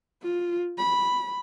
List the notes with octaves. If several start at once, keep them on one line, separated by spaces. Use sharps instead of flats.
F4
B5